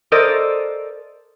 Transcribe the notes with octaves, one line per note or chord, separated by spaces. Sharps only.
A4 A#4 C5 D5 D#5